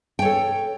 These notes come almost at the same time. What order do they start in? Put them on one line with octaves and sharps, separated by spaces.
G5 C#5 A4